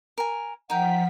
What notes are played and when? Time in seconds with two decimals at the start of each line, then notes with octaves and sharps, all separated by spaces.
0.18 A#4 G#5
0.70 F3 D#4 A#4 F#5 G5 B6